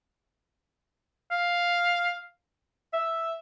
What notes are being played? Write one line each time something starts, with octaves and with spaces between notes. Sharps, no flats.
F5
E5